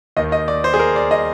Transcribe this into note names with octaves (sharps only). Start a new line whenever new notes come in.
D#2 D#3 D#5
D#5
D5
C5
G#4
A#4
D5
D#5